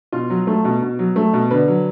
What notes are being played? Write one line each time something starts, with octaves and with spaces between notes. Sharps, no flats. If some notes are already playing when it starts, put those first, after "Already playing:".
B2 F4
F#3
A3
B2
B2
F#3
A3
B2
D3 B4
F#3